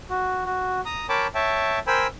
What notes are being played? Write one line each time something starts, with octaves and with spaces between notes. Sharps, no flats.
F#4
F#4
A#5 D#6
A#4 C#5 G5 A5 B5 D6
C#5 E5 G5 A5
A#4 C5 G5 G#5 B5 E6